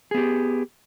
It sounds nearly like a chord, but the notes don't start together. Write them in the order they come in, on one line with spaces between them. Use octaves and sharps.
G#4 B3 G4